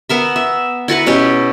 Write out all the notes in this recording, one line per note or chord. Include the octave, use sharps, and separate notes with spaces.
B3 A#4 E5
E5
E4 F#4 B4 A#5
B2 C#4 E4 G4